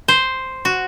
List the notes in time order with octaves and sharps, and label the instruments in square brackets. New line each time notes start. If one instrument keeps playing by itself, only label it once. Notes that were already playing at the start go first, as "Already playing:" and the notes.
[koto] C5
F#4